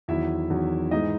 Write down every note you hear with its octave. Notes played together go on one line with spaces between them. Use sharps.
E2 D#3 F#3 E4 E5
E2 D#3 F#3
G#2 E3 G#3 D#4 D#5